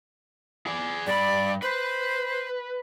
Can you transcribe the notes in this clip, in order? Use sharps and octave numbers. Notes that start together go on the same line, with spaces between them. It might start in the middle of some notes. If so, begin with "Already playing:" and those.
G#4 D5
G2 D5 B5
B4 C5